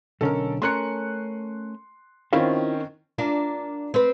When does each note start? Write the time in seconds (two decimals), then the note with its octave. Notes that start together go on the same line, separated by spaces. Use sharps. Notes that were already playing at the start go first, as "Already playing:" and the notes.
0.21 B1 D3 C#4 A4 A#4
0.62 A3 C#4 A#4 C6 F#6 C#7
2.33 D#3 C4 C#4 E4 F4 F5
3.18 D4 F4 A#4
3.94 C4 B4